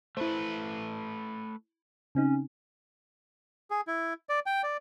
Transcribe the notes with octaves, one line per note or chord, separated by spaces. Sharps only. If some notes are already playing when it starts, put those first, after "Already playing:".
A3 E4 B4 C5
C#3 C4 C#4 D#4
G#4
E4
D5
G5
D5